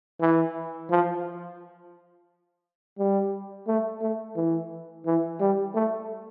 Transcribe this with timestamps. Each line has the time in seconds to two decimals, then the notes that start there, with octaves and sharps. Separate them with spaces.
0.21 E3
0.90 F3
2.99 G3
3.67 A3
4.02 A3
4.36 E3
5.06 E3
5.40 G3
5.75 A3